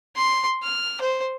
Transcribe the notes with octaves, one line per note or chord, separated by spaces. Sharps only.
C6
F6
C5